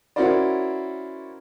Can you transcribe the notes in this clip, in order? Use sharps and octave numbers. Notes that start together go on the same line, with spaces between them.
C#4 E4 F#4 A#4 C5 D5